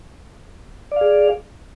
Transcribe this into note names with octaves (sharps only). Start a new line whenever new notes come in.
G#4 D5 F5